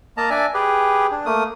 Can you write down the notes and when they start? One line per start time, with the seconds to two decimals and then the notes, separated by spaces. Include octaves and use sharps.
0.17 A#3 D#5 A5 A#5
0.30 D4 D5 E5 G#5
0.54 G4 G#4 B4
1.12 D4
1.26 A3 A#3 D#6